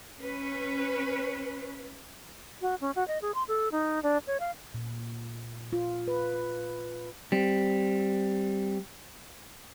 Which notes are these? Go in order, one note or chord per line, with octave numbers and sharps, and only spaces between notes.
C#4 B4
F#4
C#4
F#4
D#5
G#4
C6
A4
D#4
D4
C#5
F5
A#2
F4
B4
G3 C4